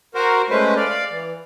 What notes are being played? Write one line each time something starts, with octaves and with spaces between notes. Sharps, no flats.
F#4 A#4 C5
G#3 A3 C#4 B4 C5
D5 F5
E3